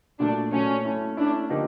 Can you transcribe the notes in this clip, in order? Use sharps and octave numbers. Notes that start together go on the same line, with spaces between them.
A#2 F#3 A3 D4
A#2 F#3 A3 C#4
A3 C#4 E4
A3 C#4 D4 E4
D3 F3 A#3 D#4 G4